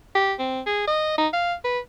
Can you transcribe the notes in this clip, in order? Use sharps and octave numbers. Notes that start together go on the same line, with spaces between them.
G4
C4
G#4
D#5
D#4
F5
B4